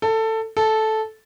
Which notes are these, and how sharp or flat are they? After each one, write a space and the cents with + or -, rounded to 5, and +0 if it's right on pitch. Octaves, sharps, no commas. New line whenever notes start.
A4 +15
A4 -10